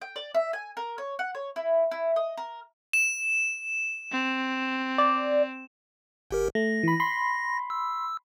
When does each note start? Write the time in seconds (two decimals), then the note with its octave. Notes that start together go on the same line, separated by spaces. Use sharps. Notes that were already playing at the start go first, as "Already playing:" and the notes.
0.02 G5
0.16 D5
0.35 E5
0.53 G#5
0.77 A#4
0.98 C#5
1.19 F#5
1.35 C#5
1.56 E4
1.91 E4
2.16 D#5
2.37 A#4
2.93 E7
4.12 C4
4.98 D5
6.31 G1 G4 A#4
6.55 A3 A#6
6.83 E3 B5
7.00 B5 C6
7.70 E6